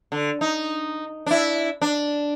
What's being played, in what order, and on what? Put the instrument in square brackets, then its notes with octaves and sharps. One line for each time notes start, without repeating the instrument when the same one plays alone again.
[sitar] D3
D#4
D4 E4
D4